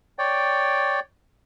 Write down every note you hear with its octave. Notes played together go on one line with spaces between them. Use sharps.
C#5 D5 G5